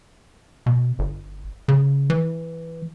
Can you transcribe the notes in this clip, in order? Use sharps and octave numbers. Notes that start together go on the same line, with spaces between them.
B2
G1
C#3
E3